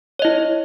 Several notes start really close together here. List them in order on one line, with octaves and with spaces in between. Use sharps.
C#5 D#5 E4